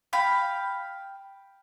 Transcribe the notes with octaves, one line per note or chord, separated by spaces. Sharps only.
F5 G5 B5